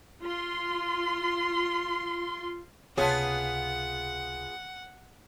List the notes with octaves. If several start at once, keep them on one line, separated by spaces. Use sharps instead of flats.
F4 C6
C#2 C3 B3 F4 G#4 C#5 F#5 A5